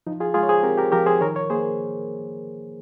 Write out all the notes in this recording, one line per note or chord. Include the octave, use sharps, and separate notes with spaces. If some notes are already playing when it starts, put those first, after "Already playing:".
F3 D#4
F4 G#4
G#3 F4 G#4
C#5
G#4 C5
C4 G4 A#4
G4 A#4
F3 G4 A#4
G#4 C5
D#3 A#4 C#5
A#4 C#5
A#3 G#4 C5